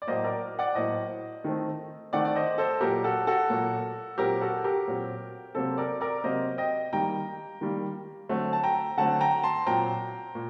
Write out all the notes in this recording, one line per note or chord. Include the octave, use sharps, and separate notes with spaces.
D5
A2 F#3 A#3 C5 D#5
A#4 D5
D5 F#5
A2 F#3 A#3 C5 D#5
D#3 A3 C4
D#3 A3 C4 D5 F#5
D5
C5 D#5
A4 C5
A#2 F#3 A#3 G4 A#4
F#4 A4
F#4 A4
A#2 F#3 A#3
A#2 F#3 C4 G4 A#4
F#4 A4
G4 A#4
A#2 F#3 C4
C3 F#3 A#3 A4 C5
A#4 D5
A#4 D5
C3 F#3 A#3 C5 D#5
D#5 G5
D#3 G3 A#3 G5 A#5
D#3 G3 A#3
D3 F#3 A3 C4
A5
G5 A#5
D3 F#3 A3 C4 F#5 A5
G5 A#5
A5 C6
A#2 F#3 C4 G5 A#5
A#2